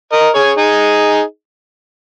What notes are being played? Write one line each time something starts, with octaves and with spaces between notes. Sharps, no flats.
A#4 D#5
G#4 C#5
D#4 G#4